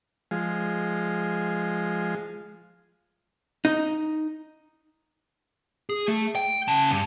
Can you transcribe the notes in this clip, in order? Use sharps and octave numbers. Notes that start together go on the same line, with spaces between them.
F3 G#3
D#4
G#4
A3
G5
C#3 A5
G2